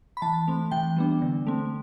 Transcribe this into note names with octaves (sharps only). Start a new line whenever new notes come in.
B5
E3 A5
A3 C4
E3 G5
G3 B3 D4
D3
A3 C4